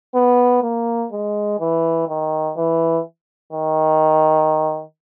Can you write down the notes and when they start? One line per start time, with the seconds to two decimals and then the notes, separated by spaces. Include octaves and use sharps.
0.15 B3
0.63 A#3
1.12 G#3
1.60 E3
2.08 D#3
2.57 E3
3.53 D#3